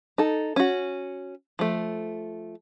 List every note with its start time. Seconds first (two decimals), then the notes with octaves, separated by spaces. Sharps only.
0.18 D#4 A4
0.56 C#4 F#4
1.59 F3 A3